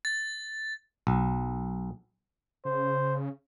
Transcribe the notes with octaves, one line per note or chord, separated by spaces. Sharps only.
A6
B1
C#3 C5